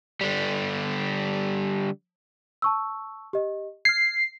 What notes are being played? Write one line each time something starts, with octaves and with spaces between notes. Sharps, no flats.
D3 G3
A5 C#6 E6
G4 D#5
F6 G#6 C7